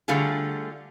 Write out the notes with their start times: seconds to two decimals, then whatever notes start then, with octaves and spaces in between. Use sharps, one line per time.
0.08 D3 G3 A3 F4 G#4